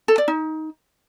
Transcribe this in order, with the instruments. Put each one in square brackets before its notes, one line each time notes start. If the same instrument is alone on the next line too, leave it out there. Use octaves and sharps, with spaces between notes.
[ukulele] A4
D5
D#4